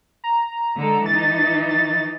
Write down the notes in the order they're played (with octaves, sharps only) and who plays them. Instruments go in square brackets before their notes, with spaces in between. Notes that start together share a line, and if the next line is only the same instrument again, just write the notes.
[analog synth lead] A#5
[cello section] D3 G#3 A4
[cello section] E3 D#4 [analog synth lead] A6
[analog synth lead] A6